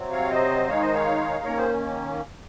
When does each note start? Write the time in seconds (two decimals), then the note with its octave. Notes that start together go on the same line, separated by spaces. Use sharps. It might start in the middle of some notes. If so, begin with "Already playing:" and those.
Already playing: C3 F#3 C4
0.11 C#5 F5
0.30 C5 D#5
0.68 D#3 G#3 D#4 C#5 F5
0.81 C5 D#5
0.94 C#5 F5
1.45 D#3 A#3 C#4 A#4 C#5
1.57 G#4 C5